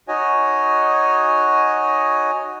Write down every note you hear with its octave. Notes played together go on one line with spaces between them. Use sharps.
D#4 F#4 C#5 D#5 G#5